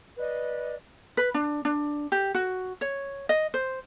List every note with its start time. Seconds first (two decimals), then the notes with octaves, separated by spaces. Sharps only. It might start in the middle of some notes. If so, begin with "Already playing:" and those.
0.18 B4 D5 D#5
1.17 B4
1.34 D4
1.65 D4
2.12 G4
2.35 F#4
2.81 C#5
3.29 D#5
3.54 C5